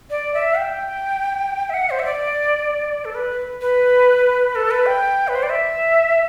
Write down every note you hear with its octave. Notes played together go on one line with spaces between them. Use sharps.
D5
E5
G5
E5
F#5
C5
E5
D5
A4
B4
B4
A4
B4
G5
B4
C5
D5
E5